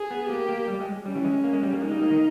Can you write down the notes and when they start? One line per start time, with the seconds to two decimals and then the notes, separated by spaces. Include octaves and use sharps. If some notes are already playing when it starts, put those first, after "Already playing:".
Already playing: G#4
0.11 B3
0.29 A#3 G4
0.49 A#3
0.68 G3
0.81 G#3
1.06 G3 C#4
1.15 E3
1.25 G#3
1.44 A#3
1.53 G#3
1.63 G3
1.73 A#3
1.81 G#3 D#4
1.91 G3
2.01 A#3
2.11 D#3